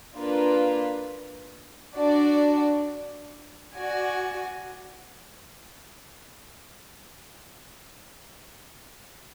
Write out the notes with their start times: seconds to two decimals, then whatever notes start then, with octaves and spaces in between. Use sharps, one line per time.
0.17 A#3 D4 F4 B4
1.96 D4 F#4 D5
3.76 F#4 D5 G#5